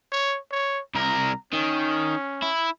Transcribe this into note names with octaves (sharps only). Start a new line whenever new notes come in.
C#5
C#5
C2 A#4 A#5
D#3 C#4
E4